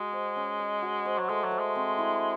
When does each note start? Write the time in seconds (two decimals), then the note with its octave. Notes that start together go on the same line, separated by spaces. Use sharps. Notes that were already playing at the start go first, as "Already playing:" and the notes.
Already playing: G#3 F#4 D#5
0.13 C5
0.36 C#4
0.59 D#5
0.82 F#4
1.05 C5
1.18 F#3
1.29 G#3 A3
1.44 F#3
1.51 C5
1.59 G#3
1.75 C4
1.98 E4